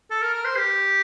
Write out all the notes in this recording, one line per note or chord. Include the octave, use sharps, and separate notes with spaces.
A4
A#4
A#4
C5
G4